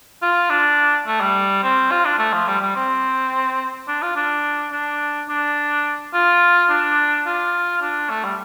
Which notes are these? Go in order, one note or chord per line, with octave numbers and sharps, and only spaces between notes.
F4
D4
A3
G3
C4
F4
D4
A3
F3
G3
G3
C4
D4
F4
D4
D4
D4
F4
D4
F4
D4
A3
G3